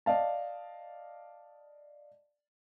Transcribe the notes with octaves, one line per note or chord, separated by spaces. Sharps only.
D5 D#5 F5 A5